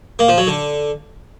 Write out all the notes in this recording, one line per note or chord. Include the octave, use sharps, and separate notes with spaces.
A#3
F3
F#3
D3